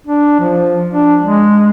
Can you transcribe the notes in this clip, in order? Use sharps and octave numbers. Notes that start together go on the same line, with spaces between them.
D4
F3
D4
G#3